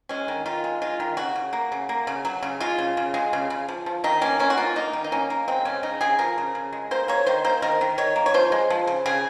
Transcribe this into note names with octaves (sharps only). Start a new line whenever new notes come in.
G#3 C#4
D#3
D#3 F4
G#3
G#3 F4
D#3
C#3 F#4
C#3
A#3
C#3
A#3
C#3
F#3
C#3
G#3 F4
C#3
C#3
G#3
C#3
C#3
F3
F3
D#3 D#4
A#3 C#4
A#3 C#4
F#4
A#3 F4
A#3 D#4
D#3
D#4
A#3 C#4
A#3
G#3 C4
C#3 C#4
C#3 D#4
C#3 G#4
F3 A#4
C#3
C#3
G#3
A#3 C5
A#3 C#5
D#3 C5
A#3 C5
D#3 A#4
D#3
D#3 C#5
A#3
C#5
F3 C5
G#3
F3
C#3
C#3 G#4